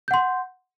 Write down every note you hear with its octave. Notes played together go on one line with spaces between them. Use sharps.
F#5 C6 G6